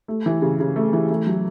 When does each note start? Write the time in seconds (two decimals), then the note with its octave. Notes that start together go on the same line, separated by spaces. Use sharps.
0.08 A3
0.26 E3
0.42 C#3
0.60 C#3
0.76 A3
0.93 E3
1.10 A3
1.27 F#3